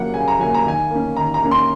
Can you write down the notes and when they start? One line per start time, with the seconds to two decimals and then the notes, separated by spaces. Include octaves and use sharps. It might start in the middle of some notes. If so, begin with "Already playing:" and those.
Already playing: C#3 F#3 A#3 F#5
0.14 C#3 G#5
0.28 A#5
0.39 F#3 A#3 G#5
0.54 A#5
0.66 D#3 G#5
0.91 A#3 C#4
1.17 D#3 A#5
1.34 A#5
1.43 A#3 C#4
1.51 C6